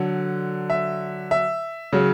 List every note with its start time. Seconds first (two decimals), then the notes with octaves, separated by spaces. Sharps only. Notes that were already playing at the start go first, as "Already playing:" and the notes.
Already playing: D3 F#3
0.70 E5
1.31 E5
1.93 C#3 F#3